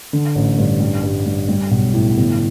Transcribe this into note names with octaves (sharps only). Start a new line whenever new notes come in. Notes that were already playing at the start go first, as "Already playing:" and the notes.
D3
A1
G2
G3
G2
G3
G3
B1
A2
G1